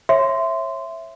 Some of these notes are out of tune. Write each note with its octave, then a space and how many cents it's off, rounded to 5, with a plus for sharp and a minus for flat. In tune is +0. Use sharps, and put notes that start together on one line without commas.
C#5 -30 E5 +5 C6 -15